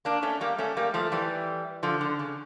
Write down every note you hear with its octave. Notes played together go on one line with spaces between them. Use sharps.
A#3 D4
A3 C#4
G3 A#3
A3 C#4
G3 A#3
F3 A3
E3 G3
D3 F3
D3
C#3